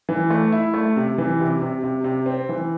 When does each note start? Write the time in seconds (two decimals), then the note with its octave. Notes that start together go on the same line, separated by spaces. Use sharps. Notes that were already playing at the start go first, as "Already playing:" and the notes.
0.09 E3
0.30 A3
0.52 E4
0.74 A3
0.96 C3
1.18 E3
1.40 C3
1.62 C3
1.84 C3
2.04 C3
2.26 C4
2.49 E3